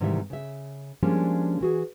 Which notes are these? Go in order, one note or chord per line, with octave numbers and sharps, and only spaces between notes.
G#2 C3 D#3 E3 G3 E5
C#3 E5
F3 G3 G#3 A#3 C#4 D4
E3 F#4 G#4